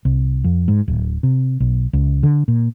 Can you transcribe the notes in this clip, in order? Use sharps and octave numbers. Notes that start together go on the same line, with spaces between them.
C2
F2
G#2
D1
C3
B1
C#2
D3
A#2